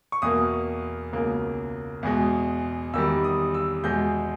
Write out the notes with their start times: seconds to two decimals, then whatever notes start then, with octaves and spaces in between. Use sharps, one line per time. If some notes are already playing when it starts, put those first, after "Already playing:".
0.12 C#6
0.22 E2 B2 A#3 D#6
1.13 C#2 B2 A#3
2.03 E2 B2 G#3
2.94 E2 D#3 G3 E6
3.24 D#6
3.54 E6
3.84 E2 B2 G#3 G6